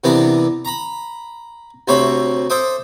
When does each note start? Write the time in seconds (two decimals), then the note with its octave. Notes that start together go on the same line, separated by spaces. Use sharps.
0.04 C3 E3 B3 D4 A#4
0.65 A#5 B5
1.88 D2 C3 C5 C#5 E5 B5
2.50 A4 C5 E5 D6 D#6